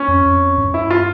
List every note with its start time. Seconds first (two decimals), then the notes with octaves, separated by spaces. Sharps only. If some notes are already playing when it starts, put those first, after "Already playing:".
Already playing: C#4
0.08 F2
0.25 F2
0.58 G2
0.74 E4
0.90 F4